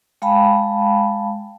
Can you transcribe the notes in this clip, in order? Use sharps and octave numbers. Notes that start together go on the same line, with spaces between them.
G#3 F5 G5 A5 B5